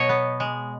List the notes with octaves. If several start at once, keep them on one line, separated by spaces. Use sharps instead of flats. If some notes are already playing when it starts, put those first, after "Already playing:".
Already playing: B2 F#3 C#5 D#5
B3
G#3